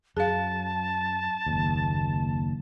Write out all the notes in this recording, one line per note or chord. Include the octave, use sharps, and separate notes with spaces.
F#2 G#4 F5 A5
F#1 D#2